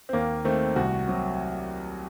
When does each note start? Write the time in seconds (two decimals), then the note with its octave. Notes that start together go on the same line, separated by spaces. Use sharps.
0.09 C4
0.13 D#2 A#3
0.45 D#3 A3 C4
0.76 C2 F#4
1.08 C3 F#3